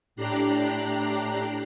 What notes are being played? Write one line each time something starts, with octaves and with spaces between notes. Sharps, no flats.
A2 D4 G4 A#5 F#6 C7